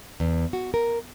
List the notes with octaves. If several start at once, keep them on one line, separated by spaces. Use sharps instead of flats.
E2
F#4
A#4